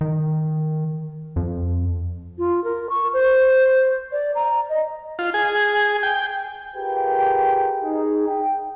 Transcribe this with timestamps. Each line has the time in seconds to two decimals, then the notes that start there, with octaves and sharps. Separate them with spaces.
0.01 D#3
1.36 F2
2.38 F4
2.64 A#4
2.90 C#6
3.13 C5
4.12 D5
4.35 A#5
4.70 D#5
5.19 F4
5.34 G#4
6.03 G5
6.76 F4 G4 G#4 A#4 B4 G5
7.84 D#4 G#4
8.27 G5